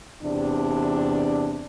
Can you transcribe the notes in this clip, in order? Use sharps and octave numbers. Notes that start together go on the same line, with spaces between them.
E2 C3 D4